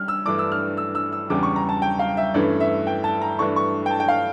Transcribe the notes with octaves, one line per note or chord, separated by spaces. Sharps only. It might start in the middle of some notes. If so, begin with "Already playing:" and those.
Already playing: G3 C#4 F6
E6
G2 E3 A3 D4 D6
E6
F6
E6
E6
E6
E2 C#3 G3 D4 D6
C#6
A#5
A5
G5
F5
E5
G2 E3 A3 C#4 D5
E5
G5
A5
A#5
G2 E3 A3 D4 C#6
C#6
G5
A5
G5
F5